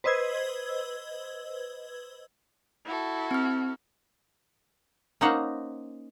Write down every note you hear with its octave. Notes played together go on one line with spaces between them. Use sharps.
B4 C5 D#5 E6 G#6
E4 F#4 A4
C4 F6
A#3 C#4 D#4 C5 F#5 A#5